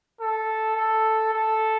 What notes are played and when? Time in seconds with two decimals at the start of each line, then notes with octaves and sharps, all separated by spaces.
0.20 A4
0.77 A4
1.33 A4